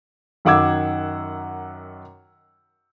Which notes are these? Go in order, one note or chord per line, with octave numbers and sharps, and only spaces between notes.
F#2 D#3 F#5 D6 E6 G#6